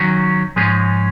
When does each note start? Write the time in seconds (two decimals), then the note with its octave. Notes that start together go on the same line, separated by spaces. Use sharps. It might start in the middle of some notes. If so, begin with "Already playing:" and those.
Already playing: D#3 F#3 C#4
0.56 G#2 F3 G#3 C#4 G#4